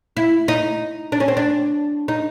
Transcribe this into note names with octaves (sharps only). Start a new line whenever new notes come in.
E4
D#4
D4
C#4
C4
D4
D#4